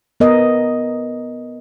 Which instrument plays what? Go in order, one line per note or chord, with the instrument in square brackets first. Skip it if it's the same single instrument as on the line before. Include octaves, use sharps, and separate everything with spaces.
[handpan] B3 A#4 D#5